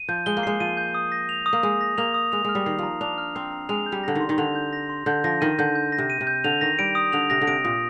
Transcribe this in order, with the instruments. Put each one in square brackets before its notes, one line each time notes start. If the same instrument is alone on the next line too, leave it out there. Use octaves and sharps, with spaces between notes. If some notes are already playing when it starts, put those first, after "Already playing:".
Already playing: [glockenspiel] D#7
[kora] F3 [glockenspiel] G6
[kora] G#3 [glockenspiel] G7
[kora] A#3
[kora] G#3 [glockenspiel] C7
[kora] F3 [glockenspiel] D#7
[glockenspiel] G6
D#6
A#6
F7
D#6
[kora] A#3
[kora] G#3 [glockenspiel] D#6
[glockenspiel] A#6
[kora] A#3 [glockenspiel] F7
[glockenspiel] D#6
[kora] G#3 [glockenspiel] F7
[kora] G#3 [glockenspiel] F6
[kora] G3
[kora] D#3 [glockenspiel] C7
[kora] F3 [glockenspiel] A#5
[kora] D4 [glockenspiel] F7
[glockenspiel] F6
[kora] C4 [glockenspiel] C7
[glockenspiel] A#5
[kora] G#3 [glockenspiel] F7
[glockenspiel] G6
[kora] G3
[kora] D3 [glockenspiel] A#6
[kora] D#3
[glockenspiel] C6
[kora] D#3
[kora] D3 [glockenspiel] F7
[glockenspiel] G6
A#6
C6
[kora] D3 [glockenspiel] G6
[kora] F3 [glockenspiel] A#6
[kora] D#3 [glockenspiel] D#7
[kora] D3 [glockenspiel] G6
[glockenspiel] G6
A#6
[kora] C3
[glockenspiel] D#7
[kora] C3
[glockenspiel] G6
[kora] D3 [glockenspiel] F7
[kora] D#3 [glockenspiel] A#6
[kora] G3 [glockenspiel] D7
[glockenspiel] D#6
[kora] D3 [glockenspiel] F7
[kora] C3 [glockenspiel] A#6
[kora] D3
[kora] C3 [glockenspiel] D7
[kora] A#2 [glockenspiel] D#6